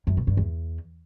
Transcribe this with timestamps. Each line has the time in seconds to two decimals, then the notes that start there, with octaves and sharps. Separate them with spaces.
0.07 F#2
0.17 B2
0.27 G2
0.37 E2